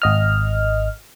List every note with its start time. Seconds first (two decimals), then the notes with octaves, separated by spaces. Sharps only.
0.02 G#1 D#5 F6